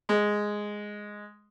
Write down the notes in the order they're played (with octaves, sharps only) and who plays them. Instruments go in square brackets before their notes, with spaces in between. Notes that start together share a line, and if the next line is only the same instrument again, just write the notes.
[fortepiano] G#3